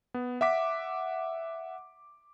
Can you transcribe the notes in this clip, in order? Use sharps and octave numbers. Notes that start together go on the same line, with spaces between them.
B3
E5 F#5 D6 B6